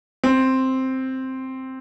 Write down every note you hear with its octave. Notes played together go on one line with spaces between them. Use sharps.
C4